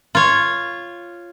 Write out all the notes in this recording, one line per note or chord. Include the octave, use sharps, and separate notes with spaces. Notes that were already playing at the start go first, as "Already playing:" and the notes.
F4 C#5